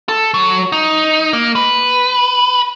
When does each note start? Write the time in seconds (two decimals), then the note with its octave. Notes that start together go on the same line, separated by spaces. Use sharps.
0.09 A4
0.34 F#3
0.72 D#4
1.33 A#3
1.55 B4